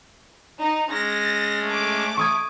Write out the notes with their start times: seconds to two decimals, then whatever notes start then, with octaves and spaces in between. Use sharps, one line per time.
0.59 D#4
0.90 G#3 C#4 A#6
1.67 A3 D6
2.17 C#6 D#6 G#6